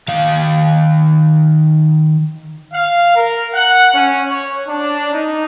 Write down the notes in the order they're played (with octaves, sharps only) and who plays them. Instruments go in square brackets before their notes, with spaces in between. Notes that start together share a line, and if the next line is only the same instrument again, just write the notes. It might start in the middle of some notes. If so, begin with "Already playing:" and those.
[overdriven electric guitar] D#3 F5
[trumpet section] F5
A#4
F#5
C#4
C#5
D4
D#4